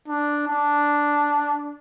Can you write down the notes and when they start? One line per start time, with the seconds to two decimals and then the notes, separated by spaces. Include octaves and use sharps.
0.08 D4
0.48 D4